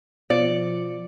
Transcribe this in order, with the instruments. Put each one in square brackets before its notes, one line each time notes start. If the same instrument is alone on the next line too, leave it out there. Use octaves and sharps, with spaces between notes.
[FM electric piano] B2 F3 C#7 [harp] D5